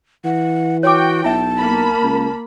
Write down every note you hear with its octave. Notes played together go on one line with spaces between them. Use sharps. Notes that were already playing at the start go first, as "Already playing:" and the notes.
E3 F#5
F#4 C#5 G5 D6
B1 E4 E5 A5
A#3 B5
C#2